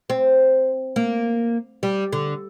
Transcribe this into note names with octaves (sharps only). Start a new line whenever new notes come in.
C4
A#3
G3
D3